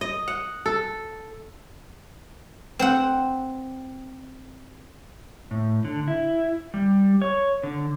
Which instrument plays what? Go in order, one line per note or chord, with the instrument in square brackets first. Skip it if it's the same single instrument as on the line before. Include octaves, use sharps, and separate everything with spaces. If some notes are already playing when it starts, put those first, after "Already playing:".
[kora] D#5
F#5
A4
[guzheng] C4 C5 F#5
[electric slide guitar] A2
D3
E4
G3
C#5
D3